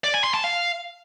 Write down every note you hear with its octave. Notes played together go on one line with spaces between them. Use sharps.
D5
G#5
C6
A5
F5